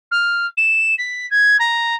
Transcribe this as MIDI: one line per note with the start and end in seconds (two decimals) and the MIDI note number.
0.11 0.46 89
0.57 0.94 100
0.98 1.29 95
1.30 1.57 92
1.59 1.95 82